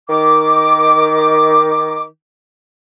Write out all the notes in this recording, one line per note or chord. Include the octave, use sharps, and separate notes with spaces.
D#3 D6